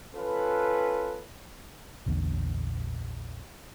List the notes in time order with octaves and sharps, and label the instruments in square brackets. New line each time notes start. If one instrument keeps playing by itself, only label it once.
[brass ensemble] C#4 F4 A4 B4
[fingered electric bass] A#1 E2 A#2 D3